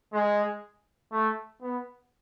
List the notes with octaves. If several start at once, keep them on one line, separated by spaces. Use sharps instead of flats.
G#3
A3
B3